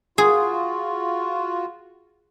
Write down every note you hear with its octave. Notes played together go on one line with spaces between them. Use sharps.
F4 F#4 G#4